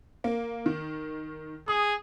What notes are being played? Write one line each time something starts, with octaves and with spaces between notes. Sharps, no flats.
A#3
D#3
G#4 D#6